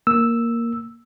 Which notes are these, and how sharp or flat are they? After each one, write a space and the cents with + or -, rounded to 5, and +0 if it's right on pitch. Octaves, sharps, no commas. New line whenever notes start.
A#3 +0 E6 +0